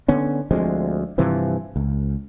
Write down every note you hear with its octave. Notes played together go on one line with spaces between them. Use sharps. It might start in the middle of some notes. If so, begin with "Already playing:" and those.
D3 B3 C#4
D2 F3 G#3 C4
G2 C3 E3 F3
C#2